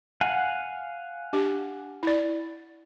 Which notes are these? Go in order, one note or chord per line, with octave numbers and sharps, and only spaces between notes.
F5 F#5 G#5
D4 G4
E4 D5